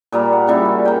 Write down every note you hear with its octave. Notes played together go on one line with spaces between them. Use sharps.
A#2 G3 A#3
F#5
A#2 C#3 G3 E4
F#4
A#3 G5